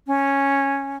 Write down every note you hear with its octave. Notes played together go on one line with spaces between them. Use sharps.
C#4